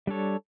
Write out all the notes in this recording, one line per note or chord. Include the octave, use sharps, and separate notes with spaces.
G3 D4 A4 C#5